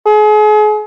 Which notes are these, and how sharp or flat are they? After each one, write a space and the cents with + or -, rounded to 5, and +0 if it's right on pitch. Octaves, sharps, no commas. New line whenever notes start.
G#4 +35